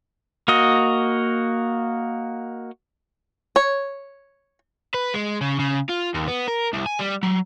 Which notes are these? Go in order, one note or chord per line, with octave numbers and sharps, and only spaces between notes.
A#3 F#4 D#5
C#5
B4
G#3
C#3
C#3
F4
D#2
B3
A#4
C2
G#5
G3
F#3